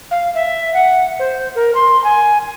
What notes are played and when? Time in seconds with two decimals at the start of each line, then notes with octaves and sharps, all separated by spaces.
0.11 F5
0.34 E5
0.74 F#5
1.19 C5
1.55 A#4
1.75 C6
2.04 G#5